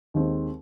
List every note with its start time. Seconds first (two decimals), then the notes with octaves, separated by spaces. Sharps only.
0.14 D#2 D#3 G#3 C4